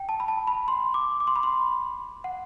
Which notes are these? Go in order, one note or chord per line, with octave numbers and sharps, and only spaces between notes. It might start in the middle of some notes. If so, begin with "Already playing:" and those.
Already playing: G5
A5
B5
A5
B5
C6
D6
D6
C6
B5
C6
F#5